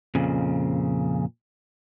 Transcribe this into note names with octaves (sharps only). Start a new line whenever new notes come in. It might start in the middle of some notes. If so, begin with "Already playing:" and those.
F2 A#2 C#3